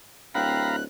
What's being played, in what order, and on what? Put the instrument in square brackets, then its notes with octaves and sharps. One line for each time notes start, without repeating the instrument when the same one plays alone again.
[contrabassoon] D1 [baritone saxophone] C4 [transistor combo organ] F5 A#5 B5 [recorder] F#6